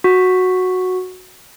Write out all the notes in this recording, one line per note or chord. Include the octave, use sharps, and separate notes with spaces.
F#4